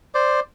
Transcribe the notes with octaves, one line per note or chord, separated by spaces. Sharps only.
C5 D5